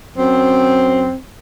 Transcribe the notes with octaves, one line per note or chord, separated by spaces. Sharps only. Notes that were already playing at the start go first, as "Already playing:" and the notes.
F#2 C4